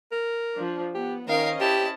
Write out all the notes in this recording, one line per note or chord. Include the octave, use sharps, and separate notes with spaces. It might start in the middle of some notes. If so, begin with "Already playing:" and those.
A#4
F3 D4
B3 G4
D#3 C#4 A#4 C5 D#5 F5
E4 G4 A5